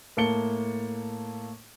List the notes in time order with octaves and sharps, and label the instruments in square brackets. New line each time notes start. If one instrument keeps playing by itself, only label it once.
[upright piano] A2 A#3 A5 C#7 G7